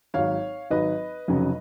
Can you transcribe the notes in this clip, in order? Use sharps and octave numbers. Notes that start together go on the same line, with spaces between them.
G#1 G#2 F#3 C#5 F5
G#1 G#2 F#3 B4 D#5
F1 F2 C#3 F#3